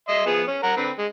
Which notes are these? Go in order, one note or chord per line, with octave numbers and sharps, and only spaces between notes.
D#5 E5 C6
F3 B3 G#4
C#4
A#4 F#5 A#5
D3 C4 B4
G#3